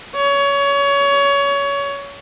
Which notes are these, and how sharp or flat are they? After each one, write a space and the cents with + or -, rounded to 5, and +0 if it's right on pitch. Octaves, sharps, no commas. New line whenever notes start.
C#5 +25